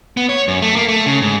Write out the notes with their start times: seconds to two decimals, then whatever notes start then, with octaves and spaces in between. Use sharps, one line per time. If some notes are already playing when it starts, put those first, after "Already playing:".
0.17 B3
0.29 C#5
0.48 F#2
0.62 A3
0.76 A#3
0.88 A3
1.06 C#3
1.22 G#2